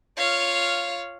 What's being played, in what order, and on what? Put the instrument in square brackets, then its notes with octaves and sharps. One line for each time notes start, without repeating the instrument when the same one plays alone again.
[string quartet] F4 C#5 F5